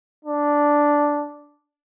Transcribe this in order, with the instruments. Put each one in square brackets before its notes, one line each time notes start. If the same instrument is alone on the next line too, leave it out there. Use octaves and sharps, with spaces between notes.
[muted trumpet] D4